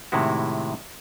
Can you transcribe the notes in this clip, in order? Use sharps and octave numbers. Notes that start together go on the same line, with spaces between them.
A2 C3 D#3 G#3 E4 F#4